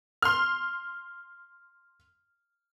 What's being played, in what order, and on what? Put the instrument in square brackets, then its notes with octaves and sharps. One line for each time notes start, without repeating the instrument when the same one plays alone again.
[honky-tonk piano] C6 F6